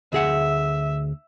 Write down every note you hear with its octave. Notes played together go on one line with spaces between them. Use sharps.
D2 G#4 E5 F#5